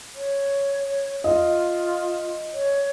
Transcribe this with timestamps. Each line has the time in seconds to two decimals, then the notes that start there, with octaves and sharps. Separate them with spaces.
0.15 C#5
1.24 F4 D#5
2.53 C#5